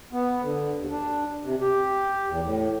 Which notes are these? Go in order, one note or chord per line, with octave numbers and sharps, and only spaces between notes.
B3
D3
D#2
D4
C3
G4
E2
A2